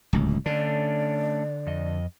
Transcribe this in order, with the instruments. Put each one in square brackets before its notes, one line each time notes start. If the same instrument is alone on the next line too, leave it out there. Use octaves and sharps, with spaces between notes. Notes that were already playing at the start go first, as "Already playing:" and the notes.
[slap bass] D1 C#2
[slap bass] D3 [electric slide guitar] A3 C#4 D4 [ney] D5
[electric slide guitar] F2 D#5